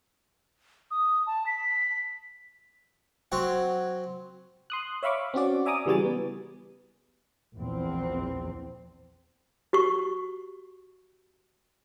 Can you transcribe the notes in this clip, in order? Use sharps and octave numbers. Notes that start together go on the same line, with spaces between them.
D#6
A5
B6
F#3 C4 C#5 F#5
C6 D#6 F#6
C#5 E5 F5 B5 C#6 D6
C4 C#4 F#4 D5
D5 E5 G#5 A#5 D6 D#6
C#3 E3 G3 F#4 G#5 A6
B3
A#1 E2 C4
F#4 G4 C#6